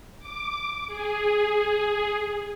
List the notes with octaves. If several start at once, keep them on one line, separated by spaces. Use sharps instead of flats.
D6
G#4